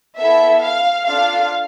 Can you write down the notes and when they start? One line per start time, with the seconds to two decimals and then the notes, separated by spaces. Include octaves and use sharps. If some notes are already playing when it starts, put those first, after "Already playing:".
0.18 B3 E4 A4 E5
0.63 F5
1.06 D4 F4 A4 F5